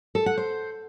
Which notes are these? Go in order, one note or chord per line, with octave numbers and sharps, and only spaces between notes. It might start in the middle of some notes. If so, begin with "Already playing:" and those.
A4
F#5
C5